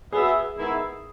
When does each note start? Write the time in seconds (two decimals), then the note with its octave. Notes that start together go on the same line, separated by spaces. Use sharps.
0.12 B3 F#4 G#4 B4 E5
0.57 D#3 G#3 B3 E4